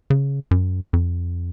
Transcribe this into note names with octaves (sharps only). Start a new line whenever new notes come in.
C#3
F#2
F2